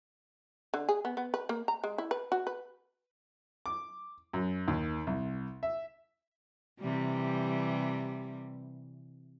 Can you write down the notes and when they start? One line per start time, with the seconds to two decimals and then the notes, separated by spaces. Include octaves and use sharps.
0.74 D3
0.89 G#4
1.05 B3
1.17 B3
1.34 B4
1.49 A#3
1.68 A#5
1.84 G#3
1.98 E4
2.11 B4
2.32 F#4
2.47 B4
3.66 D6
4.33 F#2
4.68 D#2
5.07 C2
5.63 E5
6.80 C3 E3 G3